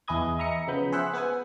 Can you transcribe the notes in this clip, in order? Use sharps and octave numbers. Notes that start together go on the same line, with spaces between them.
E2 E4 G#4 B4 D#5 G#6
D#5 E5 A#5 D#6 C#7
C#3 F3 B3 B5 G6
G#4 C5 E5 F#5 E6 F#6
B3 G#4 B4 F#5 G#5